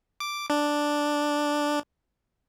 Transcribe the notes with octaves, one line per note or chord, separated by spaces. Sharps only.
D6
D4